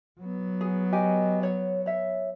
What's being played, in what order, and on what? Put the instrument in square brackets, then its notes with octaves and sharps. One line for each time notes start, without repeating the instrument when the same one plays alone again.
[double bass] F#3 B3
[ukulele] G#4
G4 D#5 G#5
C#5
C#5 E5